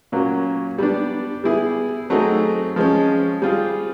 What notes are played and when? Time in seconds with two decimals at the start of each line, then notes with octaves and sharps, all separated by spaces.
0.12 A#2 F#3 A#3 C#4
0.78 G3 B3 D4
1.44 G3 B3 E4 G#4
2.10 F#3 A3 C4 D#4 G#4
2.76 F3 G#3 C#4
3.42 G3 C4 F4 G#4